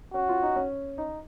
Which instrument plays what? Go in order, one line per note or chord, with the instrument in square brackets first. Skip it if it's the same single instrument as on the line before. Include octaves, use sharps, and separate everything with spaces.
[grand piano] C#4 [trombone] F#4
[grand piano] F4
D#4
C#4
D#4